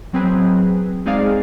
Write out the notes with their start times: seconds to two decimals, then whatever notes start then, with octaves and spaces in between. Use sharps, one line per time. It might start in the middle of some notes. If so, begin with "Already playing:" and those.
0.13 F#3 C4 G#4 B4
1.05 G#3 C4 D#4 G#4 D5 F5